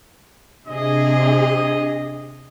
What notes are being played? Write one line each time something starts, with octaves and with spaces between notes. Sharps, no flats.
C3 D4 G#4 D#5